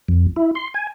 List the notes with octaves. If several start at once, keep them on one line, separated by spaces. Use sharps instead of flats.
F2
E4
C6
G#5